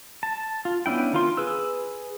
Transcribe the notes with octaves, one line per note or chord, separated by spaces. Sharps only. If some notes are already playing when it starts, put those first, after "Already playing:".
A5
F4
B3 C#4 D4 E4 G5
D#3 F4 C6
G#4 B4 E6